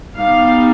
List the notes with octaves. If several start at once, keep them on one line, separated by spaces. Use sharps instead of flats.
G3 B3 D#4 F5